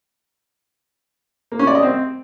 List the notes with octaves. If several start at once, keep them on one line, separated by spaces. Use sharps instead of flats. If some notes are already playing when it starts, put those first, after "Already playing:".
A#3
C#4
D5
D#5
C4